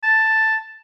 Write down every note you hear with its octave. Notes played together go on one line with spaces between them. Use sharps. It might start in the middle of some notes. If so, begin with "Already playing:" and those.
A5